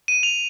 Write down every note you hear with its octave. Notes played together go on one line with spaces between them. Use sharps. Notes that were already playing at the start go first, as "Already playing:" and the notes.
D#7
F7